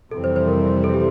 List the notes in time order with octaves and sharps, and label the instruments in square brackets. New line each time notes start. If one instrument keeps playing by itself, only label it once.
[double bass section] F2 C3 E3 G3 C4 [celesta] A4
[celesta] C5
C5
A#4
A4
G4